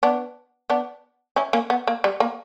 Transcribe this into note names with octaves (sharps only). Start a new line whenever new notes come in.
B3 D4
B3 D4
C#4 E4
A#3 C#4
B3
A#3
G3
A#3